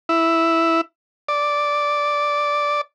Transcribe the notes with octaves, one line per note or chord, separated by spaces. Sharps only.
E4
D5